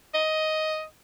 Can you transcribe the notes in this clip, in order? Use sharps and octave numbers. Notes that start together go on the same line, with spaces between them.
D#5